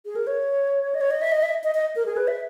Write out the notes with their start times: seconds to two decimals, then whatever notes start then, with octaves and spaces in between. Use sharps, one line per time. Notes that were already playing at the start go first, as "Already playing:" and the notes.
0.06 G#4
0.16 A#4
0.27 C#5
0.94 D#5
1.01 C#5
1.11 D#5
1.21 E5
1.32 D#5
1.43 E5
1.64 D#5
1.75 D#5
1.96 A#4
2.06 G#4
2.17 B4
2.28 E5